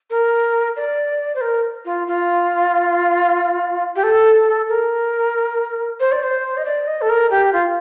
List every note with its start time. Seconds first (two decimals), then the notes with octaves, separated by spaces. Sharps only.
0.10 A#4
0.76 D5
1.35 C5
1.41 A#4
1.85 F4
2.07 F4
3.96 G4
4.03 A4
4.69 A#4
6.00 C5
6.12 D5
6.23 C5
6.57 D#5
6.65 D5
6.87 D#5
7.01 A4
7.09 A#4
7.31 G4
7.53 F4